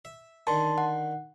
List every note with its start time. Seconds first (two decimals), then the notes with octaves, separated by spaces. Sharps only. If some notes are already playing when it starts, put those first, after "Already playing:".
0.05 E5
0.47 D3 D#3 A5 C6
0.78 F#5